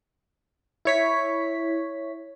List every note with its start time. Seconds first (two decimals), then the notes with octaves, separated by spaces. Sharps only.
0.85 E4 C#5 B6